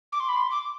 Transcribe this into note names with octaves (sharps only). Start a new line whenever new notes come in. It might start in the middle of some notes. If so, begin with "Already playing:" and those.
D6
C6
B5
C6
D6